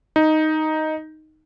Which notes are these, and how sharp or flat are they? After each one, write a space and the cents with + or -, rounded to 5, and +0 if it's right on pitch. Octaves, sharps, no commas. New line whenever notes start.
D#4 +0